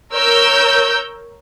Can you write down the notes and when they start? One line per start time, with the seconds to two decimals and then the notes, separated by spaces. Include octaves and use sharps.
0.14 A#4 C#5 E6 G6